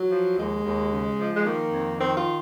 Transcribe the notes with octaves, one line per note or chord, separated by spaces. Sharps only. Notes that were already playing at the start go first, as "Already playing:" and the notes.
Already playing: F#3
F3
D#2 G#3
D#2
C#3
F3
G#3
D#3 A#3
F2
D#3 C4
F4